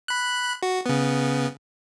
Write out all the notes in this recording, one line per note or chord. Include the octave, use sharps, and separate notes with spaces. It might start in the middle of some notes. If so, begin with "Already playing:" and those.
B5 F#6
F#4
C#3 B3